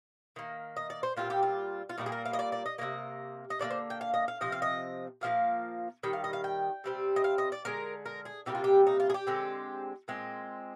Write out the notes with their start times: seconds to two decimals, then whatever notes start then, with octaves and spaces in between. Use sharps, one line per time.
0.36 D#3 A#3
0.77 D#5
0.90 D5
1.03 C5
1.17 A#2 G3 C4 F4
1.30 G4
1.43 F4
1.89 F4
1.98 A#2 G3 A#3 D#4
2.06 G#4
2.12 A#4
2.25 F5
2.33 D#5
2.39 D5
2.52 D5
2.66 D#5
2.78 C3 D#3 A#3 D#5
3.50 D#5
3.59 D3 F3 A#3 D5
3.70 C5
3.90 G5
4.01 F5
4.14 D#5
4.28 F5
4.41 C3 F3 C4 D#5
4.52 F5
4.62 D#5
5.21 A#2 F3 A#3 F5
6.03 D#3 G3 G5
6.13 F5
6.24 D#5
6.33 F5
6.44 G5
6.84 C3 G3 C4
7.16 D#5
7.24 F5
7.38 D#5
7.52 D5
7.65 D3 G#3 C4 A#4
8.06 A#4
8.25 G#4
8.46 C3 G3 A#3 G4
8.55 F4
8.64 G4
8.87 D#4
9.00 F4
9.10 G#4
9.14 G4
9.27 D3 G#3 C4
10.08 A#2 G#3 C4